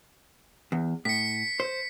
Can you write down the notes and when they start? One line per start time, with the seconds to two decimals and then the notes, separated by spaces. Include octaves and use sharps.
0.72 E2
1.05 A2 B6 C#7
1.60 C5